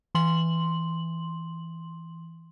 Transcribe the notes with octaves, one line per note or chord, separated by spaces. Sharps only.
E3 C6 F#7